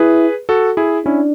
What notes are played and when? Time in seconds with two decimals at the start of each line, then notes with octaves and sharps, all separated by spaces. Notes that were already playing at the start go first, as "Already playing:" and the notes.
Already playing: E4 G#4 B4
0.49 F#4 A4
0.77 E4 G#4
1.05 C#4 D4 E4